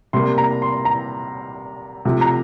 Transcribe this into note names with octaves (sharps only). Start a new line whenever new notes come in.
C3 G3 A#3 C6
A#5
C6
A#5
C3 F3 A3
A#5